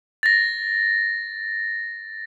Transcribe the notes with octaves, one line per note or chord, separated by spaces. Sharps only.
A6 A#6